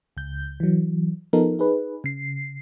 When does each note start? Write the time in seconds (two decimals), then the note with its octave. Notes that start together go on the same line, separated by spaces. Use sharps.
0.17 C#2 G6
0.60 E3 F#3
1.33 F3 B3 D#4 A4 A#4
1.59 D#4 G#4 B4
2.04 C#3 C7